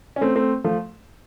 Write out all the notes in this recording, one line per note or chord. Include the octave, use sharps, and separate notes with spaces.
C#4
A3 C4
A3 C4
F3 A3